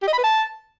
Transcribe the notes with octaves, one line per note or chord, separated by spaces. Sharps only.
G4
D#5
B5
B4
A5